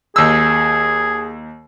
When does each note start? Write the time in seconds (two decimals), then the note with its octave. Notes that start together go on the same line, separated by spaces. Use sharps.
0.16 D#2 G#4 E6